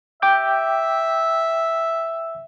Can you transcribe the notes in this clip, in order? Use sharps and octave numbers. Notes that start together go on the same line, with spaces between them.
E5 G5 D6 G6